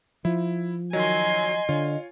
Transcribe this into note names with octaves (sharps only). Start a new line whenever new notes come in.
F3 E4
D#3 F#3 D#5 G#5 C6
D3 F4 C#5